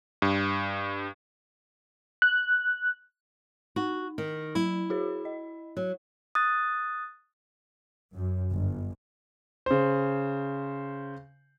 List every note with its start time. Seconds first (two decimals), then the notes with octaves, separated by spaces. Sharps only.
0.22 G2
2.22 F#6
3.76 D#4 F#4
4.18 D#3
4.55 F#3 E4
4.90 F#4 G#4 C#5
5.25 D#5
5.77 F#3
6.35 D#6 F#6 A6
8.15 F#2
8.53 G1
9.66 C#3 C5